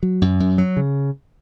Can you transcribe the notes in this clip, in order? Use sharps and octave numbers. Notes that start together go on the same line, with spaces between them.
F#3
F#2
F#2
F#3
C#3